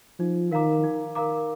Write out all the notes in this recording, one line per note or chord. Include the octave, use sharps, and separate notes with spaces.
F3 D#4
D#3 A#4 F5 A#5 D6
D#4
A#4 F5 A#5 D6